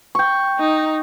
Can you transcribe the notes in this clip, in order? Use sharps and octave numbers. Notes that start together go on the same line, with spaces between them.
G5 C#6
D#4